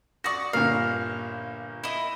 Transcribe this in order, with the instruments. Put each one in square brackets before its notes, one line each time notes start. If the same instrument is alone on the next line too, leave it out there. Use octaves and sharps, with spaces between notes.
[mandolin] F#4 D5 [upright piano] C#6 D#6 A#6
[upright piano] G1 A#2 A#3 [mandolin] F5
[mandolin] E4 D#5